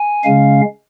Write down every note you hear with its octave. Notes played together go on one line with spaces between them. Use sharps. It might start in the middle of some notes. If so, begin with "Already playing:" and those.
Already playing: G#5
C#3 G#3 C#4 F5